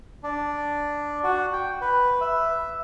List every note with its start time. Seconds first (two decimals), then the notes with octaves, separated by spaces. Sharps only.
0.23 D4
1.24 F#4
1.53 G5
1.81 B4
2.21 E5